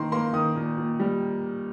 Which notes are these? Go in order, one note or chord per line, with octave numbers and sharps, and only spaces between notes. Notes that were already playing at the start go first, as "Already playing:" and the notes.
Already playing: D#3 A#3 C6
A#3 C6
D#3 D#6
A#2
A#2
G3